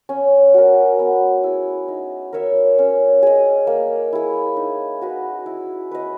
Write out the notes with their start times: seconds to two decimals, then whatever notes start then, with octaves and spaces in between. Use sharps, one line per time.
0.09 C#4
0.54 F#4 A#4
0.99 B3
1.44 E4 G#4
1.88 D#4
2.33 A#4 C#5 E5
2.79 C#4
3.23 G#4 D#5
3.67 A#3
4.13 E4 G#4
4.57 D#4
5.01 F#4 B4 D#5
5.46 E4
5.91 B4 D#5